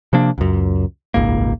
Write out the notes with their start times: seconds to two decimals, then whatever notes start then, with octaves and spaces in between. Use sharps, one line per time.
0.13 C3 F3 A#3 D4
0.38 C#2 F#2
1.14 D#1 G#1 C#2 A#3